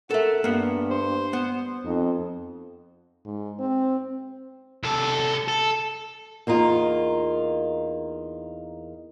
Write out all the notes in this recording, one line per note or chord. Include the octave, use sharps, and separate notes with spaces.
A4 A#4 E5 F#5
G2 A#3 B3
C5
B3
F2 D#4
G#2
C4
C2 A4
A4
E2 A#3 D#4 F4